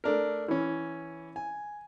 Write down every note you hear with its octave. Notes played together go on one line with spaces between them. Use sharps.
A3 D4 A#4
E3 C#4
G#5